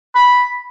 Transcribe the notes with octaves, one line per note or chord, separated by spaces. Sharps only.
B5